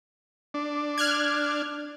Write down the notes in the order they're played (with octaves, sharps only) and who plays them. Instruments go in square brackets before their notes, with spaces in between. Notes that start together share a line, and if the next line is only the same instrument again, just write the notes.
[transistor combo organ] D4
[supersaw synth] F6 F#6 G#6